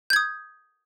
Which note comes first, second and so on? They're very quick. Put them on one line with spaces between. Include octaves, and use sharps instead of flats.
G6 G#6 D#6